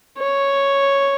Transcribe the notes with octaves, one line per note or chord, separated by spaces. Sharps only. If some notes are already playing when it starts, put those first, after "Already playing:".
C#5